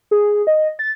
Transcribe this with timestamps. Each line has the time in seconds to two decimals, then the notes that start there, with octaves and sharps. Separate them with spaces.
0.11 G#4
0.47 D#5
0.79 A6